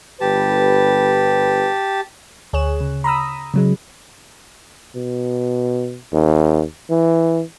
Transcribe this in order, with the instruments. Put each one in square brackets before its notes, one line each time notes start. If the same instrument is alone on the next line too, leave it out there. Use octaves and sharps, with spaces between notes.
[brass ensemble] G1 B4 [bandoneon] G4 A5
[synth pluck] D2 G#4 C#5 F#6 E7
C#3
A#5 B5 D#6 E6
C#3 F#3 G#3
[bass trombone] B2
D#2
E3